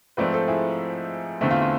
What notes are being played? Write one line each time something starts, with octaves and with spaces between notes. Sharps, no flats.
G#2 F3 A3 C4 B4 D5
A4 C5
E4 G#4
E2 D3 A3 C4 E4
F4
F4